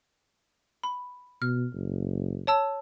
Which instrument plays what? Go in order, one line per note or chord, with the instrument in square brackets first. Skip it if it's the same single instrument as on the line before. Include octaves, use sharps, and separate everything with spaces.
[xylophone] B5
[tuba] B2 [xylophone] F6
[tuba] F#1
[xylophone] C#5 A5 E6